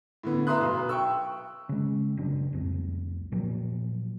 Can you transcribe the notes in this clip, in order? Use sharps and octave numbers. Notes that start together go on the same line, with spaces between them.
A2 D3 B3
B4 E5 A#5 C6 D#6 F#6
B1
G5 C#6 E6
C#3 G#3
F#1 C#3 F#3 D4
C2 F2
A#2 F3 F#3